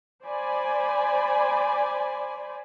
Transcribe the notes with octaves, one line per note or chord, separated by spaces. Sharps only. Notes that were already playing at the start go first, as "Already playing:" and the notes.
C5 D5 G#5 B5